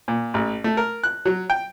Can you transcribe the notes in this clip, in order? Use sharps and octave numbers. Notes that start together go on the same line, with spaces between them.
A#2
A1
A3
A#4
F#6
F#3
G5